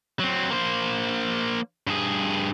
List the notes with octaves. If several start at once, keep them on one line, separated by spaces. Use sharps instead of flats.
F#3 C4
A#3 C5
G2 G#4